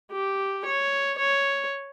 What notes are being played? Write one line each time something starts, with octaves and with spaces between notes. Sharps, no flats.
G4
C#5
C#5